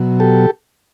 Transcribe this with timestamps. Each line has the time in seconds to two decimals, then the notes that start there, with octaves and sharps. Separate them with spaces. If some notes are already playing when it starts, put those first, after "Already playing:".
Already playing: B2 F#3
0.20 G4 A4